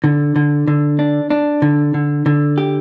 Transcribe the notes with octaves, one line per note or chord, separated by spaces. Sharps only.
D3
D3
D3
D4
D4
D3
D3
D3
G4